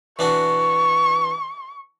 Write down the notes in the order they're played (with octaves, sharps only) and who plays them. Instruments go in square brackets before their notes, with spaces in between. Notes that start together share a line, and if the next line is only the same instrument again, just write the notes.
[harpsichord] E3 D4 F#4 [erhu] C#6